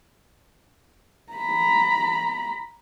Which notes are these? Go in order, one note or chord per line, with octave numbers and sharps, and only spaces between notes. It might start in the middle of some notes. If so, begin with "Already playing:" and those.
A#5 B5